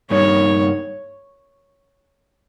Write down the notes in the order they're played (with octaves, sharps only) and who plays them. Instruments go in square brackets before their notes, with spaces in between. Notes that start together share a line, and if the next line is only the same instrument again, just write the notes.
[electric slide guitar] G2 G3 A#3 D#4 [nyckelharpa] C#5